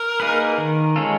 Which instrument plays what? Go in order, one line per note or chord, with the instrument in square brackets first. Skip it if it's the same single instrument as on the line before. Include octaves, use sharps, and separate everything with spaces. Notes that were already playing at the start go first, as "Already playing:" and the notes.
Already playing: [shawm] A#4
[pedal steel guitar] A#3 D#4 G#4 B4
D#3
G#3 C#4 F4 A4